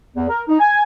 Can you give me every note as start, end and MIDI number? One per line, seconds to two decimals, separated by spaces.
0.15 0.26 40
0.29 0.41 70
0.48 0.55 63
0.60 0.82 80